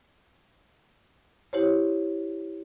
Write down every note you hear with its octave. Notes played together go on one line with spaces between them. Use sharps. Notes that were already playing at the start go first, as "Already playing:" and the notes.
E4 G4 C5 C#5